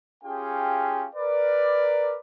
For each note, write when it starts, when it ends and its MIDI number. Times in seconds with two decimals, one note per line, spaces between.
0.24 1.07 61
0.24 1.07 65
0.24 1.07 67
0.24 1.07 68
0.24 1.07 77
0.24 1.07 79
1.15 2.16 70
1.15 2.16 71
1.15 2.16 74